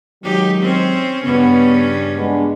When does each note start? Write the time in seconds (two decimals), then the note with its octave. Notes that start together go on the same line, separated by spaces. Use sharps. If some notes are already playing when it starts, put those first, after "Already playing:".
0.23 D#3 F#3 G#3 D#4 G4
0.62 C4 C#4
1.24 G2 C#3 B3 C#4
2.16 G#3 B3 D4